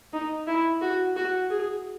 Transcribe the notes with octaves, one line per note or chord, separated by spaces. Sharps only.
D#4
E4
F#4
F#4
G#4